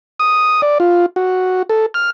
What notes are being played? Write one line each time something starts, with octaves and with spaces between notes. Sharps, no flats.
D#6
D5
F4
F#4
A4
F6